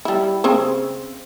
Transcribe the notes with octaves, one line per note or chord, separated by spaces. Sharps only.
G3 E4
C#3 C4 C5